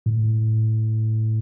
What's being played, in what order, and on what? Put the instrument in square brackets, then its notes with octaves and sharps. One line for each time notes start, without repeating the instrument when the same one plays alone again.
[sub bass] A2